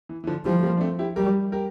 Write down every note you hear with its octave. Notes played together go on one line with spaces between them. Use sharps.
E3
E3
D3 F3
E3 F3 G3
A3
G3 A#3
D4
A3 C4
E4 G4
G3 G4 A#4
G4 A#4